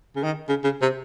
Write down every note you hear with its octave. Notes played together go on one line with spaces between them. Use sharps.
C#3
D#3
C#3
C#3
C3